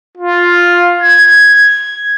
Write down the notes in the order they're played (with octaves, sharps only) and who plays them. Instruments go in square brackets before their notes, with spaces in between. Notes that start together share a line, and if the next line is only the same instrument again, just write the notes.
[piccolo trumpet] F4
G#6